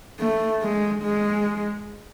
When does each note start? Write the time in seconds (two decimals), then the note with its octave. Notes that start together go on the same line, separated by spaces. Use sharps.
0.20 A3
0.62 G#3
1.03 G#3